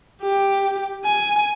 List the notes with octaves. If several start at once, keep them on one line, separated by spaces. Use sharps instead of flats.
G4
G#5